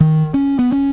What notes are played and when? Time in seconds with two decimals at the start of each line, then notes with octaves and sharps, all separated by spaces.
0.01 D#3
0.34 C#4
0.59 B3
0.72 C#4